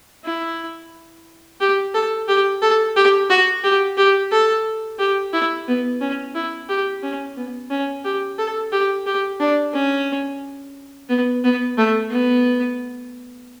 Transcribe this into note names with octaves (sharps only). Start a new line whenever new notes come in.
E4
G4
A4
G4
A4
G4
F#4
G4
G4
A4
G4
E4
B3
C#4
E4
G4
C#4
B3
C#4
G4
A4
G4
G4
D4
C#4
B3
B3
A3
B3